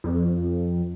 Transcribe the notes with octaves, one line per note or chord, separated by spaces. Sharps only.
F2